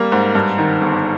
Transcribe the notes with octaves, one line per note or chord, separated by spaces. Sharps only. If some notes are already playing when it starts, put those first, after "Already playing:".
Already playing: G3 A#3
G#2
G2
D#3
G1